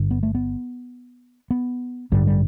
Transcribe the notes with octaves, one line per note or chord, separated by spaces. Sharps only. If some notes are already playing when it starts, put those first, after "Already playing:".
Already playing: G1 G2 D3
B3
A3
B3
B3
A1 G2 D3 G3
G3